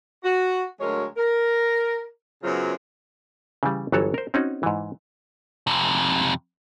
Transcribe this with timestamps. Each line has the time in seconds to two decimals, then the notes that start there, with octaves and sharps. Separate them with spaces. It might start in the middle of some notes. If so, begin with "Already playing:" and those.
0.24 F#4
0.81 D2 F#3 G#3 A#4 C#5
1.17 A#4
2.44 F#2 C#3 F#3 B3 F4 C5
3.63 C#3 E3 G3
3.92 G1 E3 F#3 F#4 A4 C#5
4.14 A#4 C5
4.34 C4 C#4 D#4 F#4
4.63 G#2 E3
5.67 F2 C3